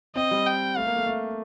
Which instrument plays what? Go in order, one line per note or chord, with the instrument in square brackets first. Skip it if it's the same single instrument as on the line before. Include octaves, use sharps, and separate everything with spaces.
[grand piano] C4 [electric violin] D#5
[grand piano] G3
[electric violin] G5
[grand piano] A3 [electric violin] F5
[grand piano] A#3
A3
A3